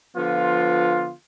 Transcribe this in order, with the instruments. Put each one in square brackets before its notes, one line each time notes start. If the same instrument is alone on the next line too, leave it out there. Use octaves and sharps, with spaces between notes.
[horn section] D3 F3 B3 F4